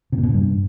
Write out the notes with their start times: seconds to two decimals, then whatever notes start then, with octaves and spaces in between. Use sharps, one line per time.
0.12 C3
0.18 A#2
0.23 B2
0.29 C3
0.34 G2